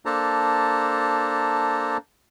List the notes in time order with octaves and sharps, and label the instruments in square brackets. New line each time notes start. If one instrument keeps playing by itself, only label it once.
[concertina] A#3 D4 A4 C5 A5 A#5